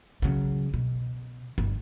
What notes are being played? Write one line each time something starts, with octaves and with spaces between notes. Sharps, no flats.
C#3 F#3
B2
G1